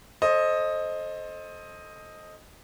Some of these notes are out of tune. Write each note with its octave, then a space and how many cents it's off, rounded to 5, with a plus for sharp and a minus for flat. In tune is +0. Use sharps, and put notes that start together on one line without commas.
A4 -5 C5 +20 D#5 +0